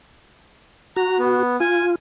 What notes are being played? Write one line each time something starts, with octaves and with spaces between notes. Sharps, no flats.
F#4 A#5
B3
F4 G#5